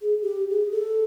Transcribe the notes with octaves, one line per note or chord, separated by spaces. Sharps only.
G#4
G4
G#4
A4